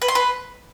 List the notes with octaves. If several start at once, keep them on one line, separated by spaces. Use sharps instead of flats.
B4
C6
B4